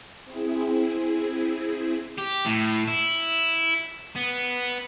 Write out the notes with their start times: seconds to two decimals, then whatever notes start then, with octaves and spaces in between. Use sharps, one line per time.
0.24 C4 E4 G#4
2.18 G4
2.46 A2
2.88 E4
4.16 B3